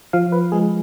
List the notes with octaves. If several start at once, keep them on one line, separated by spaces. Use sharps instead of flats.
F3 F5
B4
G#3 G#4